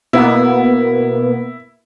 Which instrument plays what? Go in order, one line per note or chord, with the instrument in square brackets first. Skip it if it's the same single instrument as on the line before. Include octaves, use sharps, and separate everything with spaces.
[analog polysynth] B2 A#3 B3 [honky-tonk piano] E4